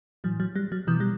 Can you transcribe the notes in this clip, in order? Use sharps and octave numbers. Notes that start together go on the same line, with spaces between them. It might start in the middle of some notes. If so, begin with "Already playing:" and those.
A2 E3 F#3
F#3
G3
F#3
B2 E3
G3